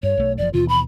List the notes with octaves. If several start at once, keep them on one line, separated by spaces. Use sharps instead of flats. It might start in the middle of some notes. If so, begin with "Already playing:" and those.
G2 C#5
B1 A3
F#1 C3 F3 D5
D#2 B2 E3 F4
B5